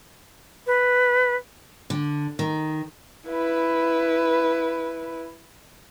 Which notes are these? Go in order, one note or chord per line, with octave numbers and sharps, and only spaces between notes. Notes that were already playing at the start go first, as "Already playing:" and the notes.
B4
D3
D#3
E4 B4